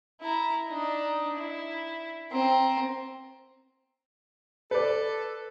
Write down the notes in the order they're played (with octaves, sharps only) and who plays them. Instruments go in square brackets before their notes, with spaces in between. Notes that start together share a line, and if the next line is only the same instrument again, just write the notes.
[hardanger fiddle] E4 A#5
D4 D#4
E4
C4 A#5
[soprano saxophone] A4 [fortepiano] B4 D5